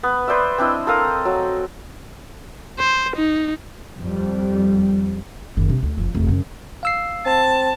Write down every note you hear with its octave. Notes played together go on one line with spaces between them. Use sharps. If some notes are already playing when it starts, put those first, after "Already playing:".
B3
B4 C5 D5 E5
C4 D4 E4 D#5
A4 A#4 F5 D#6
F#3
C5
D#4
F2 G3
F#1 D#3
C3 D4
D2
F#1 F3
F1 E2
F#2 C#3
F5 E6 C7
C4 A5